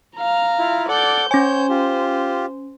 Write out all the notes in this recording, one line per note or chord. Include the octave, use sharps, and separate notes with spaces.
F5 A#5
E4 F4
A4 D5 F#5 D6 G6
C#4 C5 C#5 G#5 G6
F4 G4